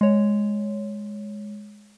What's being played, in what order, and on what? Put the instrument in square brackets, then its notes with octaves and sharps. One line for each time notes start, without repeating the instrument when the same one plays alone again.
[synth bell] G#3 C#5